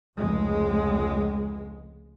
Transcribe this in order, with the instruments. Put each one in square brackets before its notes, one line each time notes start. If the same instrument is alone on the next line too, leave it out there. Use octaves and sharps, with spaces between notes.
[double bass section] F1 C#2 G#3